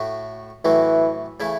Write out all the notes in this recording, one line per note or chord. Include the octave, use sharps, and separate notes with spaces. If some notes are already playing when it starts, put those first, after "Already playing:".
Already playing: A2 A3 F#4
A2 E3 F#3 A3 F#4
C#3 E3 A3 E4